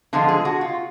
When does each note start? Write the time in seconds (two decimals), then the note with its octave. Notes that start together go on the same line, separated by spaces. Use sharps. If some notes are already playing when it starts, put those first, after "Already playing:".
0.13 D3 F3 G#3 F4
0.28 G#4
0.45 F#4
0.61 F4